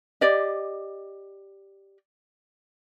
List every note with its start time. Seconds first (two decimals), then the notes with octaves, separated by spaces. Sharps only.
0.21 G4 D5 D#5